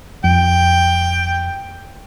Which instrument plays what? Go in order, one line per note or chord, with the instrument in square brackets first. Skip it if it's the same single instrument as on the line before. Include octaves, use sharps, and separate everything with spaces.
[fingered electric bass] F2 [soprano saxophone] G5